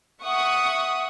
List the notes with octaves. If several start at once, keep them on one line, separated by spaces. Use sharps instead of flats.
E5 F#5 C#6 D#6